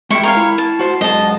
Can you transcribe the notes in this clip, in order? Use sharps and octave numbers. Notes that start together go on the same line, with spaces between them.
G#3 E4 G#4 G5 C#6
A#4 C#5 F5
E4
A5
F#4 C5
F#2 G#3 D#5 A5